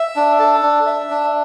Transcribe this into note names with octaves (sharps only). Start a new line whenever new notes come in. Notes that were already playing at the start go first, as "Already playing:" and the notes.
Already playing: E5
D4
A4
D4
E5
D4